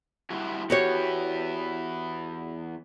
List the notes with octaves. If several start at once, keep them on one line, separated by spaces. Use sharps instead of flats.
G3 E4 F#4
E2 B3 E4 F#4 G4 C#5